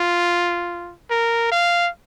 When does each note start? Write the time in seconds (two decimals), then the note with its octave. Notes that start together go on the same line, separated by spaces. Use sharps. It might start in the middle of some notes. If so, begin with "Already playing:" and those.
Already playing: F4
1.10 A#4
1.51 F5